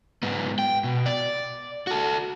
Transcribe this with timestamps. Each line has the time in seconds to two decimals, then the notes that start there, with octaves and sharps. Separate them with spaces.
0.23 G#2 B3
0.59 G5
0.84 B2
1.06 D5
1.87 F#4 A4